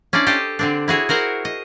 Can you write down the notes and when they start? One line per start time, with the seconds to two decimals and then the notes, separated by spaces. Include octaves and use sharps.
0.13 C#4 D4 E4 C5 D5
0.27 G4 A4 C5 D#5
0.59 D3 C4 D4
0.88 E4 F#4 G#4 C#5
1.09 F#4 A#4 C5 F#5
1.45 D#5